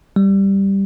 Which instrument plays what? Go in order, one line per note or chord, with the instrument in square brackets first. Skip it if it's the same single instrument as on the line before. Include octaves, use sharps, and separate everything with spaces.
[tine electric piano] G3